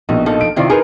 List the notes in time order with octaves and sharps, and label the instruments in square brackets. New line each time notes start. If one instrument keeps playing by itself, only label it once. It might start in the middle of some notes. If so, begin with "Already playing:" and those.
[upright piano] A#1 B2 [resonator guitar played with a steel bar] D#4
[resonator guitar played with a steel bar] F3 D#4 A4
[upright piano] D7
[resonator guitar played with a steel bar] C3 D#3 C5 [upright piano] E4 F4 D5
[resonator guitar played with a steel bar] D#4 F4 G#4 [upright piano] A#4 B4